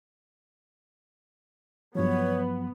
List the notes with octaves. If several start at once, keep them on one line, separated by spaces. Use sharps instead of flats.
G2 F3 F#3 B3 C#5